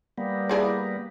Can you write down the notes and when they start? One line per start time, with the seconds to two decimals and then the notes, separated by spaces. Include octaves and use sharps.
0.18 G3 A#3 B3
0.49 E4 G#4 D5